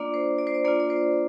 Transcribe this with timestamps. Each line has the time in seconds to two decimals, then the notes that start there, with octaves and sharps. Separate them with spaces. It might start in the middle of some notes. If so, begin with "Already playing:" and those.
Already playing: A#3 D4 F4 D5
0.14 C5
0.39 D5
0.47 C5
0.54 D5
0.65 A#3 D4 F4 D5
0.80 D5
0.90 C5